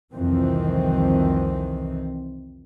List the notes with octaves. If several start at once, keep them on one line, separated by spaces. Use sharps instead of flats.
C2 F2 D#3 E3 C4